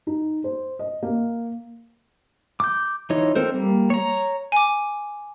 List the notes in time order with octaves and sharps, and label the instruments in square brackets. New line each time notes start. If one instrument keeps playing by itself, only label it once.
[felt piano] D#4
C5
D#5
A#3
[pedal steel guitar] D6 G6
E3 D#4 F4 C#5 D#5
C4 A4 A#4 C5
G3 A#3
C#5 A#5
[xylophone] G#5 D6